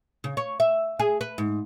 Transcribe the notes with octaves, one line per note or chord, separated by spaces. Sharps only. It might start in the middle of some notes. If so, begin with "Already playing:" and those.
C#3
C#5
E5
G#4
B4
G#2